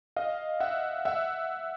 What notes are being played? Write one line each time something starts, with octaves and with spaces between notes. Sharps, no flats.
D#5 F5
E5 F#5
E5 F#5